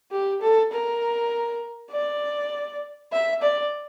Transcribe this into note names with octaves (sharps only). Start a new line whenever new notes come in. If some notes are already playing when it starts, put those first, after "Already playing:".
G4
A4
A#4
D5
E5
D5